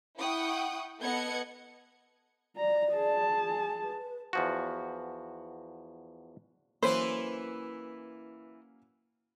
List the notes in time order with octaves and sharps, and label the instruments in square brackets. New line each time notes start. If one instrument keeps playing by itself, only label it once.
[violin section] E4 F#5 G5 C#6 D#6
B3 A4 D#5 F#5 G#6 C#7
[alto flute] D5 [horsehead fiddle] A#5
[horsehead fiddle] G#4 A5
[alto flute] G#5
B4
[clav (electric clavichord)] E2 F3 F#4
[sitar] E3 E4 B4 [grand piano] F#3 A#3 C#4 [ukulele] C5